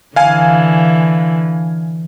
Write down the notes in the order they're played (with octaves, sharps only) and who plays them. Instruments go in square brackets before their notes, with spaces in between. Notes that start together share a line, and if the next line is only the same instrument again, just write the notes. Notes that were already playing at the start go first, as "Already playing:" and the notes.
[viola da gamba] D3 E3 [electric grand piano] F5 G#5